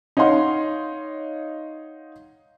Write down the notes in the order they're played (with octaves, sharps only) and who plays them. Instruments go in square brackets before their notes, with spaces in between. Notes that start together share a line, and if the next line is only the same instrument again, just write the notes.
[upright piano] D#4 C#5 F5 F#5 C6